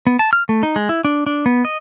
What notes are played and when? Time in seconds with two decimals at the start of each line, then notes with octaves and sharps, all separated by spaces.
0.07 B3
0.19 A5
0.33 F6
0.49 A3
0.63 D#4
0.76 G#3
0.89 E4
1.05 D4
1.26 D4
1.46 B3
1.65 D#5